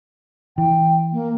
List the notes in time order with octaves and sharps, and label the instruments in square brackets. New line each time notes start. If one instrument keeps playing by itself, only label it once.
[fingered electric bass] E3 [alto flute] G5
[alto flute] A#3